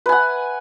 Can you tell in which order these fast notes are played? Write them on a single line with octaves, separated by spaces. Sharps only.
B4 G#5 F#5